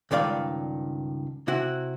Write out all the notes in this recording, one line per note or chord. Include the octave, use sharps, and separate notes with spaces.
C#2 G2 D#3 D5 F5
C3 E4 F#4